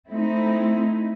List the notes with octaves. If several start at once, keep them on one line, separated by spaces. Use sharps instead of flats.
A3 C4 D#4 E4